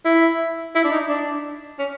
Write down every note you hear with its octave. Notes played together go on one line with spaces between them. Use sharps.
E4
E4
D4
D#4
D4
C#4